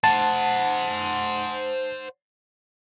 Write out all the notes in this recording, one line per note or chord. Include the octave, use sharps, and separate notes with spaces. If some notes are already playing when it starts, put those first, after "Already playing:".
C5 F#5 A5